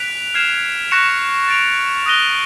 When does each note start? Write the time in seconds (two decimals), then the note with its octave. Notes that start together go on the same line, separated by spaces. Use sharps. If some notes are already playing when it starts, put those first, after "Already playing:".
Already playing: F#6 B6 D7 F7
0.34 F6 G#6 C7 E7
0.91 C#6 F#6 A#6 C#7 E7
1.48 A6 D7 F7
2.06 D#6 F#6 A#6 D#7 G7